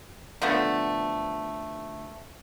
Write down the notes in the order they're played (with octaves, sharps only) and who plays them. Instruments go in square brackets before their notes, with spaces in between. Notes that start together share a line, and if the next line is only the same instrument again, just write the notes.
[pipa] D3 F3 A3 B3